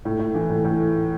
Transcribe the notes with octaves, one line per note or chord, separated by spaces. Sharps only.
A2
A2
E3
A2
A2